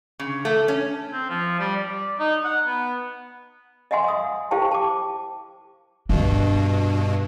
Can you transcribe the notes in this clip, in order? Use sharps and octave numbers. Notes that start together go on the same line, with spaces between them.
C#3
A3
C#4
C4
F3
G3
D5
D#4
F#5
B3
D#5 E5 F#5 G#5 C6
F5 D#6
E4 G4 C5 F5 G5 A5
A5 D6
G2 B2 D4